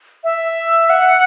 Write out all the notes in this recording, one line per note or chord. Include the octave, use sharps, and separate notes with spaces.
E5
F#5